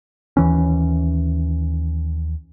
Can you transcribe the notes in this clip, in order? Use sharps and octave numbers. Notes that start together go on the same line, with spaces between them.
D#2 E3 C#4